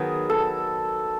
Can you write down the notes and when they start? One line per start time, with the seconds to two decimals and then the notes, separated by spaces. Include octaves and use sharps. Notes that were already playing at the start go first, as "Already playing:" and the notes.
Already playing: D#3 F#3 B3 G#4
0.30 A4